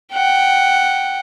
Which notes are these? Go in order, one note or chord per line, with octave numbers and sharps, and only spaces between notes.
F#5 G5